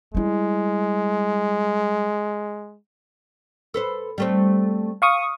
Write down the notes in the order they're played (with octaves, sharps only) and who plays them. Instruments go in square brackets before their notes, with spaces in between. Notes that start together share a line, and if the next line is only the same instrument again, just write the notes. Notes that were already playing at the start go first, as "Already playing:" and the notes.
[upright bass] G3 E4 [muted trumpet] G#3
[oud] A4 B4 C5
G3 A3 C4
[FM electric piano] F5 C#6 D#6